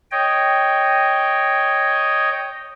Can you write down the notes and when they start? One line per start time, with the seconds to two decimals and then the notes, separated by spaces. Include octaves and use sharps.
0.11 C#5 D#5 G5